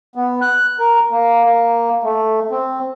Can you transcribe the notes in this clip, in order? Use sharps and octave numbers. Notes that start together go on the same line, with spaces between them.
B3
F#6
A#4
A#3
A#3
A3
C4